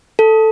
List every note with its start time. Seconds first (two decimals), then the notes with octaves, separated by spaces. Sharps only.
0.19 A4